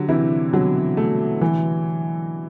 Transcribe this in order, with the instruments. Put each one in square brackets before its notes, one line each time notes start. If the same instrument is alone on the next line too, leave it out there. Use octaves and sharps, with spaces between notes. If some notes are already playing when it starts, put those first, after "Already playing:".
Already playing: [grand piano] D3 F#3 [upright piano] G4
[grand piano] C3 E3 [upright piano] E4
[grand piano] B2 D3 [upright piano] F#3
[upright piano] A3
E3